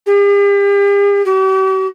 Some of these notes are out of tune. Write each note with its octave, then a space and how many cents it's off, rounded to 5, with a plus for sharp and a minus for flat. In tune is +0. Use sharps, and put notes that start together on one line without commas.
G4 +45
G4 -45